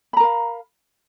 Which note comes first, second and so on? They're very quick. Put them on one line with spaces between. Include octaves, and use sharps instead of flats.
B5 A#5 A#4 F5